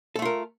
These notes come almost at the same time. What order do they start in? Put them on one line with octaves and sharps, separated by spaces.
A4 A3 F4 A#4